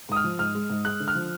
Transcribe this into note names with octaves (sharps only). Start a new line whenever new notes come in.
G#2 D#6
F6
F3
G#2 F6
G#3
G#2
G#3 F#6
D3
F6
F3